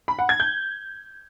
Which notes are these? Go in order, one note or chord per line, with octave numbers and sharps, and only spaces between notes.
B5
F#5
G#6
G6